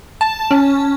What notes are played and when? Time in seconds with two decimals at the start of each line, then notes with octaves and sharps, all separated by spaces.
0.21 A5
0.51 C#4